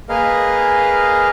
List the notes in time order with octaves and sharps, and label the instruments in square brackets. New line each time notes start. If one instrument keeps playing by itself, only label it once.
[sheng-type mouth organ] A#3 G#4 A#4 B4 D#5 F5